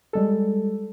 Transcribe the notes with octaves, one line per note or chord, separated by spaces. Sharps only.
G3 G#3 A4